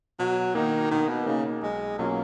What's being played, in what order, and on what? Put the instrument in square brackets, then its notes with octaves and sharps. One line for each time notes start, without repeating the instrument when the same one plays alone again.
[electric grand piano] B2 [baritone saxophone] F#3
[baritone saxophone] D#3 [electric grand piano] A#3 D#4
[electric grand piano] B2 [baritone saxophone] D#3
[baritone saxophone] B2
[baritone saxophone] C#3 [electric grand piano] A#3 D#4
[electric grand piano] B1 [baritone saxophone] G#3
[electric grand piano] B2 F#3 C#4 F4 [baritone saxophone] A#3